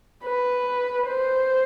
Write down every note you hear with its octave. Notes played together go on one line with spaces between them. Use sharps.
B4
C5